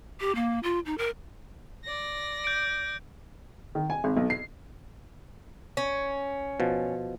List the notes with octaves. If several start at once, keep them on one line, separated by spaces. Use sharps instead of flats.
G4
A#3
F4
D#4
A#4
D5 A#6
G6 D7
D#3
G#5
G#1
B1
C7
C#4
B2 F3